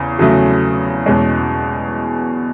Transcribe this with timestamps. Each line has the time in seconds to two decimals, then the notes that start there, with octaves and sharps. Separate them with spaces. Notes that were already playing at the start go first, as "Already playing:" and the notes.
Already playing: E2 C#3
0.19 E2 C#3 F#3 A3
1.06 E2 B2 G#3 C#4